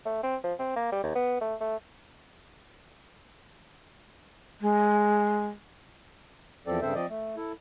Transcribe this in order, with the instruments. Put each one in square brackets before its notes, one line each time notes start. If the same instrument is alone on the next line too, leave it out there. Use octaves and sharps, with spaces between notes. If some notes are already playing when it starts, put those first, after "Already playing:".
[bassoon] A3
C4
F3
C4
A#3
G3
D#2
B3
A3
A3
[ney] G#3
[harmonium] E2 F3 C4 A4 D5
G2 C#3 C4 A4 C5 E5
F3 C4 D5 D#5
A3
E4 A4